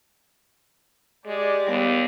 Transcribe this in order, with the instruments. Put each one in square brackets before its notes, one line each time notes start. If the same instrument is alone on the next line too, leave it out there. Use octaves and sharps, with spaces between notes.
[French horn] G#3 [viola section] G4 D5
[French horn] D#2 [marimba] G3 B3